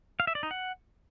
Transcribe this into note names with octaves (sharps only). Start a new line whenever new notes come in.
F5
E5
D5
D#4
F#5